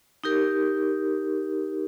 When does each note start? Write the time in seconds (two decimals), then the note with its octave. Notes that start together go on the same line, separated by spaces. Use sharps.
0.24 D#4 G4 A#4